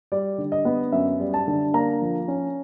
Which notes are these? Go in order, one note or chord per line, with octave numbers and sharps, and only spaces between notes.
G3 D5
D3
D#5
B3
F#2 E5
G3
A5
D3
A#3 A#5
F3
C#4